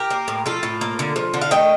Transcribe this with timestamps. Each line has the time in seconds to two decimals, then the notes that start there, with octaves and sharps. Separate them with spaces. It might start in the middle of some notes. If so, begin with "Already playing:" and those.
Already playing: G4 A#4
0.10 A#3
0.28 A2
0.46 F3 F4 A4
0.63 A2
0.81 A#3
0.99 D3
1.16 F3
1.34 D3
1.41 F5
1.51 A3 D#5 G5